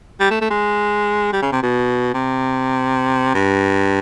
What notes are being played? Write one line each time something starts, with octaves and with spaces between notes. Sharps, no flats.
G3
A3
A3
G#3
G3
C#3
C3
B2
C3
G2